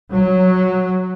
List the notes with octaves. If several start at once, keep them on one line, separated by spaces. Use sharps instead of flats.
F#3